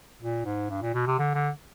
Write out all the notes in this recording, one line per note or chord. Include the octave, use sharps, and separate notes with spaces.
A#2
G#2
G2
A#2
B2
C3
D3
D3